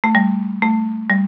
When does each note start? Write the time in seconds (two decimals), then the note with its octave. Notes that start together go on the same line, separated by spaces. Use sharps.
0.04 A3
0.15 G3
0.62 A3
1.10 G3